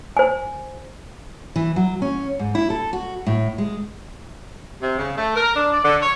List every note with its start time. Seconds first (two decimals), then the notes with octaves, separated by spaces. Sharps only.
0.17 C5 G#5
1.56 E3
1.76 F#3
2.02 C#4
2.39 G#2
2.55 E4
2.70 A4
2.93 F#4
3.27 A2
3.58 G#3
4.82 C3
4.98 C#3
5.17 A3
5.35 A#4
5.55 D4
5.72 D5
5.84 D3
6.02 C#5